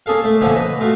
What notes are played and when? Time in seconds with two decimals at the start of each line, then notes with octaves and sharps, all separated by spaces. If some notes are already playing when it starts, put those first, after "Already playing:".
0.06 A#3 C#4 G#4 A4 F5
0.24 A3
0.41 A#2 D3 E3 F3 C#4
0.55 B4 D#5
0.80 A3 F4 F#4